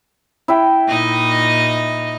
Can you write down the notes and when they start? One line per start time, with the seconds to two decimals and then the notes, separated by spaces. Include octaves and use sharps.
0.48 E4 E5 G5
0.88 A#2 D#4 D#5